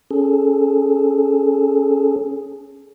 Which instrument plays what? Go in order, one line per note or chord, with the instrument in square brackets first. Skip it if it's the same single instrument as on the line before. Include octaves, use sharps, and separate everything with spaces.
[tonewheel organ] C#4 G#4 A4